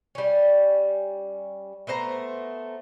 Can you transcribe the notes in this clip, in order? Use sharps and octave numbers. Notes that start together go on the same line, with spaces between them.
G3 C#4
A3 B3 C5 A#5